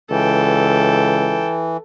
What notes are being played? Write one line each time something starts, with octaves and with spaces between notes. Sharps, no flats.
C#2 E3 A4 G5